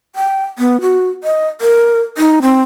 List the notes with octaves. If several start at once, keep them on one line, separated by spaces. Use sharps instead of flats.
G5
B3
F#4
D#5
A#4
D#4
C4